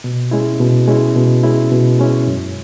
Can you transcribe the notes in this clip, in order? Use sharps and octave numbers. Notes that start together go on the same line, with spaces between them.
B2
G#3 C#4 E4
B2
G#3 C#4 E4
B2
G#3 C#4 E4
B2
G#3 C#4 E4
F#2